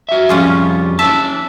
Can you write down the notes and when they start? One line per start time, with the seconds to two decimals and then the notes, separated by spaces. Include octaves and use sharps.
0.09 F#4 E5
0.29 F2 G3 C#4 F4 G#4
0.99 C#4 E5 A5